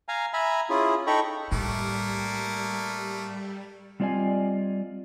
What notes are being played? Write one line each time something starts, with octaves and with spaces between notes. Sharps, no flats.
F5 G#5 A#5
E5 G#5 A#5 B5
C#4 E4 F4 G#4
D#4 A4 G5 A#5 B5 C#6
A2 G3 A3 A#3
G3 C4 F4 D5 D#5 G#5